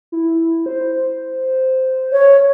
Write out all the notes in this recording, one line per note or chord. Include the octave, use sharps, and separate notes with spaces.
E4
C5
C#5